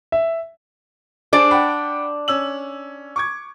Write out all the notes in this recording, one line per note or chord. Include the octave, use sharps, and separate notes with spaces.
E5
D4 G#4 C5 D5
F#5 G5 B5
C#4 E6 F#7
C#6 D6 G#6